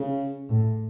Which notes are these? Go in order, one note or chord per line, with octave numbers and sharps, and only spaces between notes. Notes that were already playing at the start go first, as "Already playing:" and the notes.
Already playing: C#3
A2